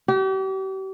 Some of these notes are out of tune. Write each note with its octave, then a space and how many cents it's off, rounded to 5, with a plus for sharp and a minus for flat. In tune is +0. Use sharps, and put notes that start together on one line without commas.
G4 -40